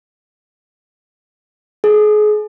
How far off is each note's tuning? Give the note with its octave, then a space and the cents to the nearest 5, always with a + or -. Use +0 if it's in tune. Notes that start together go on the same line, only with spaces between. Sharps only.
G#4 +30